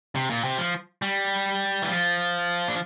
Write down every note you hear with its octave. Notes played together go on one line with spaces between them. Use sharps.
C3
A#2
C3
F3
G3
E3
F3
D4